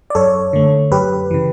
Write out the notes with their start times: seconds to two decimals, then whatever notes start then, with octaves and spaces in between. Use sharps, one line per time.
0.10 D5
0.15 F#2 A4 C#5
0.53 D3 A3
0.91 F#2 G4 B4
1.31 C#3 E3